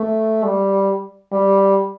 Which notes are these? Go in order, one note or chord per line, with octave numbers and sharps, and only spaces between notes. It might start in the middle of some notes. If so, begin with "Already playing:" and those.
Already playing: A3
G3
G3